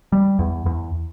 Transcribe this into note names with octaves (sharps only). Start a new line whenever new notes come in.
G3
E2
E2